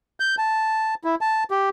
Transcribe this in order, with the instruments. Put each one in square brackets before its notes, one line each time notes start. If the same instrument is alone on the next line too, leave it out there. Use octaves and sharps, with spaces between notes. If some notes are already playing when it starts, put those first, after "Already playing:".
[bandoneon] G6
A5
E4
A5
G4